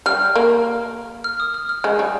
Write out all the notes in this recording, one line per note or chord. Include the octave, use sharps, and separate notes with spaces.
G3 F6
A#3
F6
D#6
F6
F6
G#3
G3